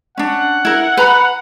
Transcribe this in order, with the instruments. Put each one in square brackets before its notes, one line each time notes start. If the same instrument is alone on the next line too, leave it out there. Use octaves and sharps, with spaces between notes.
[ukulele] C#4 D4 [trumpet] F#5
[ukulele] E4 A#4
B4 A#5 B5